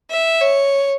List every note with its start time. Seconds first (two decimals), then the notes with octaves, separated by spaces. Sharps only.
0.11 E5
0.41 C#5